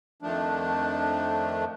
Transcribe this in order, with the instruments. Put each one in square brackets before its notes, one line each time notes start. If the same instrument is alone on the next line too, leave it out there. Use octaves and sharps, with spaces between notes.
[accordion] F2 D#3 F3 A3 D4